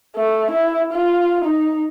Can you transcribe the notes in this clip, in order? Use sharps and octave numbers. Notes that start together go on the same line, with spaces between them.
A3
E4
F4
D#4